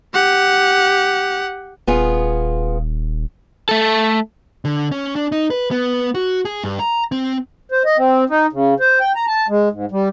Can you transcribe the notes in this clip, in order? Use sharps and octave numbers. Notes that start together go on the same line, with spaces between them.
G4 F#5
D#1 B3 F4 G#4
A3 A4
D3
C#4
D4
D#4
B4
B3
F#4
G#4
G2
A#5
C4
C5
D#5
C4
D#4
C#3
C5
G5
A#5
A5
G#3
G#2
G3